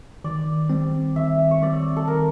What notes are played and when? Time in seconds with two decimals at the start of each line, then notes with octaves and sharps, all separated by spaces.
0.24 D#3 D5
0.70 G3 C4
1.16 D#3 E5
1.51 C#5
1.62 G3 C4 D5
1.97 A4
2.08 D#3 A#4